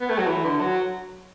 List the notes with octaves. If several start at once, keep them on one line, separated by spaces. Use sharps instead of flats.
B3
A3
F#3
E3
D3
F#3